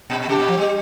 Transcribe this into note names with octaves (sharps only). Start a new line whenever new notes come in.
A#2
C3 G4
A#2
F3
G3